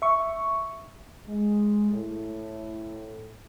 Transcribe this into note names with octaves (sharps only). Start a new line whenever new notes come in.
E5 C#6
G#3
A2